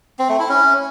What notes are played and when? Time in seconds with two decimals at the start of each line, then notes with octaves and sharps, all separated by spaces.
0.19 C4
0.29 A3
0.39 E4
0.49 C#4